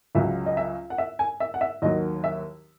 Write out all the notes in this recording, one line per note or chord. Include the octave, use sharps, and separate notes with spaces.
C#2 C#3 F#3 E5
D#5
E5
F#5
E5
G#5
E5
F#5
E5
D#2 D#3 F#3 D#5
E5